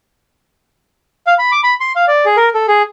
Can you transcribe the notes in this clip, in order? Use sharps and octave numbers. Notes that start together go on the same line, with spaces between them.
F5
B5
D6
B5
C6
F5
D5
G#4
A#4
A4
G#4